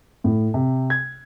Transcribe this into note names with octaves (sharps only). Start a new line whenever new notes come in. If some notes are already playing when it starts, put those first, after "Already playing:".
A2
C3
G#6